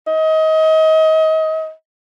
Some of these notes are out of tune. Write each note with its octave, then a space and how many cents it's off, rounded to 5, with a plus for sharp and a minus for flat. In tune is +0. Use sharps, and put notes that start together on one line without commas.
D#5 +30